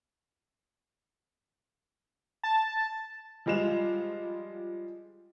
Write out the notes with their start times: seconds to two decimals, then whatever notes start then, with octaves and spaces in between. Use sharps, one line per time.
2.43 A5
3.46 F3 G3 G#3 F4 E7 F7